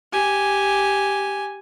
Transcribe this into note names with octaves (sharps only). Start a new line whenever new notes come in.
G4 G#5